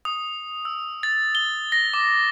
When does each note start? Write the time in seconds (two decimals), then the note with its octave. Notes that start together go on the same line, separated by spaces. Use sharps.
0.05 D#6
0.65 E6
1.03 A6
1.35 G7
1.72 A#6
1.94 D6